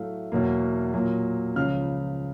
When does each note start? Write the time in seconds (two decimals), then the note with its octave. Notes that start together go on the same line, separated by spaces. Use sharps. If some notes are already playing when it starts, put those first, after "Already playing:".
Already playing: A2 F#3 A3 F5
0.32 E2 B2 F#3 A#3
0.94 A#2 F#3 A#3
1.56 C#2 C#3 F3 F5 F6